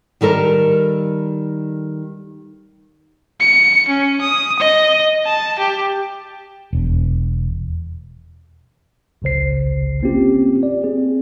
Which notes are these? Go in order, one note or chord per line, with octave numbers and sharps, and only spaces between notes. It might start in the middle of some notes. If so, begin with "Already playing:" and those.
D#3 G3 A4 A#4
C#7
C#4
D#6
D#5
A5
G4
E1
G#1 C#2 C#3 C5 C7
A#3 C4 C#4 F4 G4
D5
C4 G#4